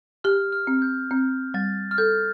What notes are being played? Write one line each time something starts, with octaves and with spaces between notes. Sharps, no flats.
G4 F6
F6
C4
G6
C4 G6
G3 A6
F6
A4 G6